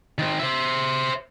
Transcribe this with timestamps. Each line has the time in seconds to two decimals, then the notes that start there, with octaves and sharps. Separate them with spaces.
0.18 D#3 C4
0.39 C5 E5